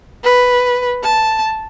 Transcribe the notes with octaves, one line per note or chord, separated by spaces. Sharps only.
B4
A5